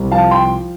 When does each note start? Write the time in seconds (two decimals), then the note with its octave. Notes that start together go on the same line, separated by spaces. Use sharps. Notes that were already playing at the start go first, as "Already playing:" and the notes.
Already playing: C2
0.11 F3 F5 A5
0.31 G5 C6